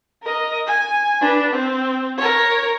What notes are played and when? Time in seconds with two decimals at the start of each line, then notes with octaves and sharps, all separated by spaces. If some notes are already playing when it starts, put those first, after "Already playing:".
0.23 A#4 D#5
0.67 G#5
1.21 D4 B4
1.53 C4
2.17 A#4 C#5